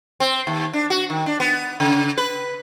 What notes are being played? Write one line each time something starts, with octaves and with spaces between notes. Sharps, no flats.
C4
D#2
D4
F#4
D#3
D4
B3
C#3
B4